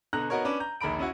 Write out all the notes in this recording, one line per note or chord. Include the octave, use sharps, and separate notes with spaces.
B2 D3 A#5 F#6 A#6
B3 D#4 F#4 A#4 C#5
C#4 D4 B4 D5
A#5 G6
A#1 D#2 A#5 B5 D7
C#4 E4 F#4